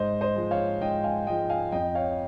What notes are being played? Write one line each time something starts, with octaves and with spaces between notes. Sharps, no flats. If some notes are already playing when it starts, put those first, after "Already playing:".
Already playing: G#2 C5 D#5
C5 D#5
F3 G#3
C#5 F5
G#2 D#5 G5
F5 G#5
F3 G#3 D#5 G5
F5 G#5
F2 D#5 G5
C#5 F5